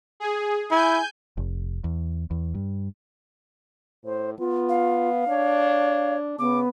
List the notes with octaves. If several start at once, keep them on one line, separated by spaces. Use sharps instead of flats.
G#4
E4 G#5 G6
F1
E2
E2
G2
A2 C5
B3 F4
F5
D4 C#5
C#3 B3 D6